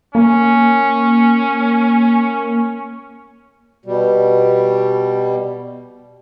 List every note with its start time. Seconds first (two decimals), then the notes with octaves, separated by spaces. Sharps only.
0.15 A#3 C#4
3.85 B2 G3